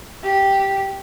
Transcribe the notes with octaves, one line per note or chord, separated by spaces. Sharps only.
G4